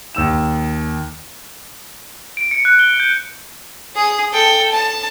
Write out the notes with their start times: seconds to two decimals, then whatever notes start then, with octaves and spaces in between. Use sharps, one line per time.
0.15 D#2 E6 E7
2.37 D7
2.51 C#7
2.65 F#6
2.79 G7
3.00 G6
3.95 G#4
4.33 A4 G5
4.72 A5